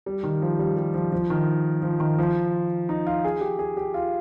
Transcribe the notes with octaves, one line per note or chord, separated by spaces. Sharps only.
G3
D#3
F3
G3
G3
F3
F3
D#3
F3
D#3
F3
D#4
F4
G#4
G4
G#4
G4
F4